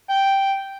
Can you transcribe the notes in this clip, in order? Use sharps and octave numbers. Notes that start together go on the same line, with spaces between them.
G5